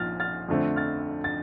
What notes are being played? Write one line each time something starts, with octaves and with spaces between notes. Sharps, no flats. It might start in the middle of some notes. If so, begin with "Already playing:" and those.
Already playing: A#1 A#2 F6 A6
F6 A6
F2 D3 A3 C4
F6 A6
A6